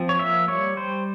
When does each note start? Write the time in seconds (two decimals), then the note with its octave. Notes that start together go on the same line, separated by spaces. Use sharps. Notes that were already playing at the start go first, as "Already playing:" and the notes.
Already playing: F3 C4
0.09 C#5
0.19 A#3 E5
0.48 G3 C#5
0.77 G3 C5